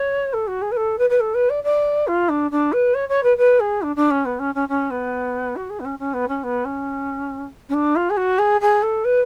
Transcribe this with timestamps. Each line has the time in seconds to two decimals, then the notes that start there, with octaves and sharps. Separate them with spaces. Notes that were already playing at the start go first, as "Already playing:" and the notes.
Already playing: C#5
0.33 A4
0.47 F#4
0.62 G#4
0.71 B4
0.76 A4
0.98 B4
1.10 B4
1.20 A4
1.34 B4
1.49 D5
1.64 D5
2.07 F4
2.29 D4
2.51 D4
2.72 B4
2.94 C#5
3.09 C#5
3.23 B4
3.37 B4
3.60 G#4
3.82 D4
3.96 D4
4.10 C#4
4.25 B3
4.39 C#4
4.55 C#4
4.68 C#4
4.90 B3
5.56 F#4
5.70 G#4
5.80 B3
5.85 C#4
5.99 C#4
6.13 B3
6.28 C#4
6.43 B3
6.65 C#4
7.69 C#4
7.74 D4
7.96 F4
8.10 G#4
8.17 F#4
8.38 G#4
8.61 G#4
8.82 A4
9.04 B4